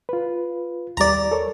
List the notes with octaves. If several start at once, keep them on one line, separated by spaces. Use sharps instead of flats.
F4 B4
D#2 G3 D5 A#5
A4 A#4 C#5